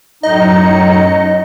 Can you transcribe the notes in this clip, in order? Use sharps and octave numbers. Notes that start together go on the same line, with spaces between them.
F#2 A2 F#3 D#4 D#5 C#7